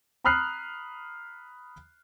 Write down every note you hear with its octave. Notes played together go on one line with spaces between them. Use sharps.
A#5 B5 D#6 F6 F#6 C7